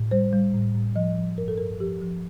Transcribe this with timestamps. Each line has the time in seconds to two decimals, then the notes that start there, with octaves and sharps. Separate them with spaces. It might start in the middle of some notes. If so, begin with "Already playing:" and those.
Already playing: A2
0.11 G3 C5
0.33 G3
0.54 A2
0.75 A2
0.96 F3 D#5
1.17 F3
1.38 G2 A#4
1.48 A4
1.58 G2 A#4
1.80 F3 G4
2.01 F3